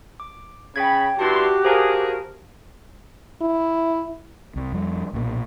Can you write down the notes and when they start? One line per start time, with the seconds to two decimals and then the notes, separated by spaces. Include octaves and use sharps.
0.20 D6
0.76 C#3 G5 B5 G#6
1.19 G2 E4 F#4 G4 A5 C6
1.65 G#4 A#4 C5 F5 A5
3.42 E4
4.56 C2
4.72 F2 G3
5.13 B1 A#2